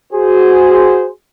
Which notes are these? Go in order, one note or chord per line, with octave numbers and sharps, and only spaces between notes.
F#4 G#4 C5